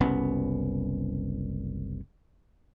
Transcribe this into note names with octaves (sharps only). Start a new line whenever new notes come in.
F#1 C2 B3 C#4